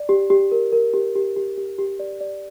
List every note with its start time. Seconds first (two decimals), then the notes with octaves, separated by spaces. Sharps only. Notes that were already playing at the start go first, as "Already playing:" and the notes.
Already playing: D5
0.09 G4
0.30 G4
0.52 A#4
0.72 A#4
0.94 G4
1.15 G4
1.36 G4
1.58 G4
1.78 G4
1.99 D5
2.21 D5